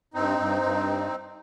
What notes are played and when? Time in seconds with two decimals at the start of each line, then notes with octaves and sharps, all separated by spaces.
0.14 G2 C4 D#4
0.38 G2
0.62 G2